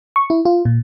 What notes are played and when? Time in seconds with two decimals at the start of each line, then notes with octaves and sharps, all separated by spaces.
0.16 C#6
0.30 E4
0.45 F4
0.65 A#2